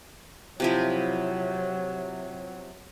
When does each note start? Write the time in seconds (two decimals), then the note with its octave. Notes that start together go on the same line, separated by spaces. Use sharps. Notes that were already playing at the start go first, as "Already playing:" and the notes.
0.60 C3 F3 F#3 E4